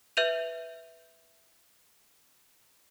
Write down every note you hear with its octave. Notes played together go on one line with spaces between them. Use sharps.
B4 E5 G6 D#7 F7